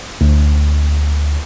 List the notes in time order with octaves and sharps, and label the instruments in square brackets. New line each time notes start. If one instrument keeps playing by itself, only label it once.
[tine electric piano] D2